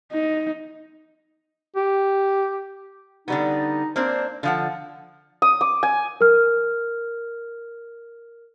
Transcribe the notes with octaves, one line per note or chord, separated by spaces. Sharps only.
D#4
G4
D3 G3 B3 D#4
A#3 C4 D4 C5
D3 F3 F5 F#5
D#6
D6
G#5
A#4 F6